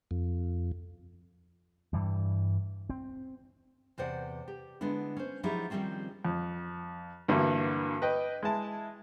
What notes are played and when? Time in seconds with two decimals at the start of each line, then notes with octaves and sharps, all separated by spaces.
0.11 F2
1.93 G2 E3 G3
2.90 C4
3.98 E2 C3 C5 D5 F#5
4.48 G4
4.81 D3 G#3 B3 D4 E4
5.17 C#4 C5
5.43 F3 F#3 D#4 E4 G4 G#4
5.70 D#3 F3 G3 A3 C4 C#4
6.25 F2
7.28 G2 D3 E3 A#3 F#4
8.02 B4 D#5 G5
8.43 G#3 E4 A5